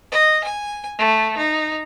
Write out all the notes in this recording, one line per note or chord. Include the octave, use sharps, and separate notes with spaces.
D#5
G#5
A3
D#4